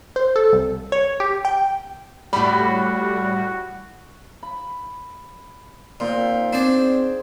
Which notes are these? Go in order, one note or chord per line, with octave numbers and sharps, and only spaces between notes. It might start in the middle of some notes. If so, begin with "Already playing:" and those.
C5
A4
C2
C#5
G4
G5
A2 G3 F#4 B5
B5
A#2 C4 D#4 F4
C4 D4 G#4 C5 D5